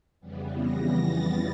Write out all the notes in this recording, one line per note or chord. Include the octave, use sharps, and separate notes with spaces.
F2 C#3 E3 G3 B3
A#6
A6